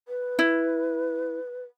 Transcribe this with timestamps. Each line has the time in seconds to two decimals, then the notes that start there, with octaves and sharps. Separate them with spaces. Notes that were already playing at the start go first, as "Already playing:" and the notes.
0.08 B4
0.39 E4